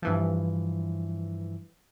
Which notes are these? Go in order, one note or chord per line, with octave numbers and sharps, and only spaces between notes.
G2 E3 F3